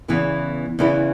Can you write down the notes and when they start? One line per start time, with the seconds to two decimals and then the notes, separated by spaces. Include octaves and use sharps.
0.08 E2 C#3 E3 B3 E4
0.79 E2 C#3 E3 B3 E4